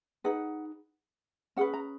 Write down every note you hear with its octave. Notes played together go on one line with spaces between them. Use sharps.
D#4 G#4 B4 F#5
C#4 G#4 B4 F#5
A#5